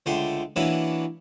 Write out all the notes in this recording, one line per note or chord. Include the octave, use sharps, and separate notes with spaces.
C#2 D3 A3 G5 C6
E3 A#3 C#4 D4 E4 F#4